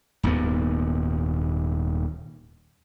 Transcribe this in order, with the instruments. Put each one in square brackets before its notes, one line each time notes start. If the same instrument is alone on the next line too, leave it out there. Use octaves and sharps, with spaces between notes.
[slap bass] D#1 D#2 G#2 B3